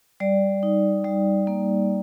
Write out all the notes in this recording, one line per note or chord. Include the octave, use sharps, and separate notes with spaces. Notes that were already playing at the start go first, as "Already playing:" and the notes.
G3 D5
D#4
G3
A#3